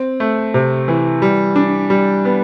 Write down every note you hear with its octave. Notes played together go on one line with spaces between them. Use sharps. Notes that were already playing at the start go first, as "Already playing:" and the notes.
Already playing: C4
A3
C3
E3
G3
D4
G3
B3